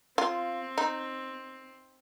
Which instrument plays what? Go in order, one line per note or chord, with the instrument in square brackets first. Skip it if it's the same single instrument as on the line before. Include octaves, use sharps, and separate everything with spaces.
[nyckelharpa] C4 [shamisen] F4
[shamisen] D#4